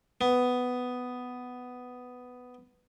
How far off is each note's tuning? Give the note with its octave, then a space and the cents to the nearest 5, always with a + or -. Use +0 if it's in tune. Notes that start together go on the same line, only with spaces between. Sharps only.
B3 +10